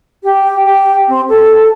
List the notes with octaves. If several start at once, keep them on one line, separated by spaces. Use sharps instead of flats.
G4
G4
C4
A4